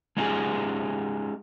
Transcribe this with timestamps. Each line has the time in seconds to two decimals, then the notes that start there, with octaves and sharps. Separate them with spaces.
0.17 G#3 C#4 D#4 F4 G4 G#4